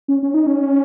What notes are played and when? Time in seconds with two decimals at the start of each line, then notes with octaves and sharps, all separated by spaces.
0.08 C#4
0.23 C#4
0.34 D#4
0.47 C#4